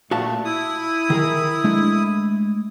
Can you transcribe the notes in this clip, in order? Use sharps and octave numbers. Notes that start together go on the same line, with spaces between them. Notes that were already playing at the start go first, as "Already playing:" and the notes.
A#2 A3 F#4 F5 A5
E4 D#6
D#3 G#4 A#4
G#3 A3 D4